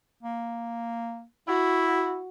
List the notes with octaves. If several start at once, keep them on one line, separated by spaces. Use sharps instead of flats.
A#3
E4 F#4